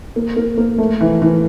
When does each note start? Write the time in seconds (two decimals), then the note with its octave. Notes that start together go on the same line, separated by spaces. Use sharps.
0.16 A#3
0.36 A#3
0.58 A#3
0.78 A3
1.01 E3
1.22 E3